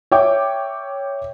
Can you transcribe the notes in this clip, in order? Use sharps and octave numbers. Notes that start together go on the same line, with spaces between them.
C#5 E5 G5 D6